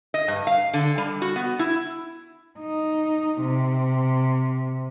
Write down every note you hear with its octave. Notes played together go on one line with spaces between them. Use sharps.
D#5
G2
F5
D3
G3
F#4
B3
E4
D#4
C3